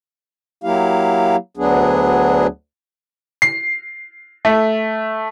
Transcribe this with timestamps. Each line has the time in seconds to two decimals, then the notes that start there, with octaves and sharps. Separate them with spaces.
0.64 F#3 A#3 E4 G4 F5
1.57 D2 F#3 B3 D4 G#4
3.42 C7
4.45 A3